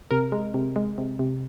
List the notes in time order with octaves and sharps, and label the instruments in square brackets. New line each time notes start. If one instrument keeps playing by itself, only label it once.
[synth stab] C3 A#4
G#3
C3
G#3
C3
C3